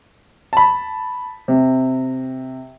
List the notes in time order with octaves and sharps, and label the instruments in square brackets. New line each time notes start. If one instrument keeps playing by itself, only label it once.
[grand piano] A5 B5
C3